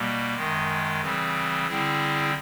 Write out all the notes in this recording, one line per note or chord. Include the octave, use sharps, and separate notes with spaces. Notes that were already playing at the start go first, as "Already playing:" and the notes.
Already playing: B2 G3 A#3
F#2 D#3 G#3
C#3 E3 G3 C4
D3 G3 C4 E4 G#4